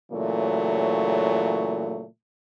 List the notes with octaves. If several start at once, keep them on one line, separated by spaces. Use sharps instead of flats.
A#2 C#3 E3 F#3 A3